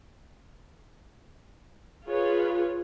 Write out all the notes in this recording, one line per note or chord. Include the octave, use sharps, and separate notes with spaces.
F4 G#4 B4 C#5